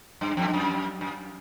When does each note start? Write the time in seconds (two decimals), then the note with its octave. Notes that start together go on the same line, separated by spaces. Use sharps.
0.21 G2
0.37 F2
0.48 G2
0.53 F#2
1.01 F#2